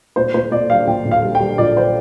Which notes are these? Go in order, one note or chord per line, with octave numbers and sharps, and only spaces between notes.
A#2 C5
A#2 C5
A#2 D5
G3 F5
A#1 G5
A#1
F5
G3
G5
G3
A#1 D5
C5